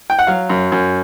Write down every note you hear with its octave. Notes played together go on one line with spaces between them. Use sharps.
G5
F#5
F#3 F5
F#2
F#2